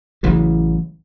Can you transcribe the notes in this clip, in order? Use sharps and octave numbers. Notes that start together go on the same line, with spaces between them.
A1 C#3 E3 F#3